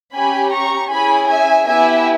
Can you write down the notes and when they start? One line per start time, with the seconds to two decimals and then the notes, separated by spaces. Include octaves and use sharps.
0.15 C#4 G4 G#5 B5
0.53 A#5 C#6
0.91 C#4 E4 G#4 G#5 B5
1.31 E5 G#5
1.68 B3 E4 G4 E5 G#5